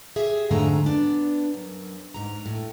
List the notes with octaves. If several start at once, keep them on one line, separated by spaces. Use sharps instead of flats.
G4 G#4 E5
F2 G#2 D3 G#3 A3 A#5
B3 D4
F#2
G#2 A#5
A2